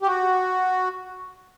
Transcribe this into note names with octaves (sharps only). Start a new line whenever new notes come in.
G4
F#4